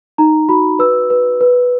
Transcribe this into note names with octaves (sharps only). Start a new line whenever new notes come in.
D#4 A#5
F#4 B5
B4 E6
B4
B4